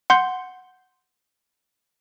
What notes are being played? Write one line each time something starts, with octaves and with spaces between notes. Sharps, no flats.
F#5 C6 G6